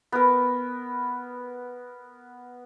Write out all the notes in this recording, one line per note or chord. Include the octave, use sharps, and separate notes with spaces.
B3 A#4